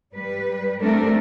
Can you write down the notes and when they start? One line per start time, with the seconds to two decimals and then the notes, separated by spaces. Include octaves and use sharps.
0.14 G3 B4
0.80 G3 A3 C4 D4 A4 A#4